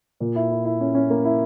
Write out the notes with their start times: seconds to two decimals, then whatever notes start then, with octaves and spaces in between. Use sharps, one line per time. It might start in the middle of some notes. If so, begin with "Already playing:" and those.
0.20 A#2
0.35 E4
0.50 E4
0.65 E4
0.80 C#4
0.95 C#4
1.10 A#3
1.25 E4